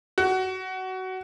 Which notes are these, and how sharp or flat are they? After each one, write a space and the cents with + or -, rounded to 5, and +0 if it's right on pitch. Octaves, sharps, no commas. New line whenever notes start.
F#4 +20